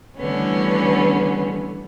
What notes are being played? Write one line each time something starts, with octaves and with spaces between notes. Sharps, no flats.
D3 E3 G3 A3 B3 C#4